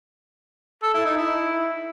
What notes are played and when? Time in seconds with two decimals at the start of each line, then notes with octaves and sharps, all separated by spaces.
0.83 A4
0.94 E4
1.05 D#4
1.17 E4